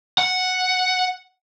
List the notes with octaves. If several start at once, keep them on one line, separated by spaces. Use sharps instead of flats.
F#5